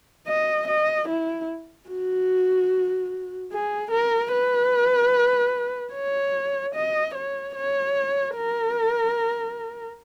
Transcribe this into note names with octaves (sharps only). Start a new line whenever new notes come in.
D#5
D#5
E4
F#4
G#4
A#4
B4
C#5
D#5
C#5
C#5
A#4